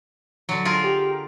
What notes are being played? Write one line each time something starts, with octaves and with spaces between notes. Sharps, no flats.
D3 F#3
F4 G#4 A#4
G4